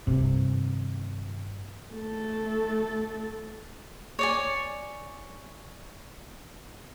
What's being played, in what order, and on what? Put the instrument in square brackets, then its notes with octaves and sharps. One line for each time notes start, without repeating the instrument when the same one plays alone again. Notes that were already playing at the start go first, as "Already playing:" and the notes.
[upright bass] G2 D#3 [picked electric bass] C3
[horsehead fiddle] A3 A4
[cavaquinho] C#5 D5 G#5